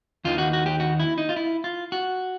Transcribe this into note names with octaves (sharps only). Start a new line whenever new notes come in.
D#2 D#3 F4
F#4
F#4
G4
F#4
E4
D#4
F4
E4
F4
F#4